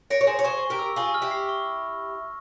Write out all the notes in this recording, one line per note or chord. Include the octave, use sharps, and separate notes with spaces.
A#4 C#5 A#6
C#5
G#4 C5 A#6
C#5
G#4 C5 C#6
C#6
G4 A#4
E6
F4 G#4 C#6
F6
E4 G4
C7
C#6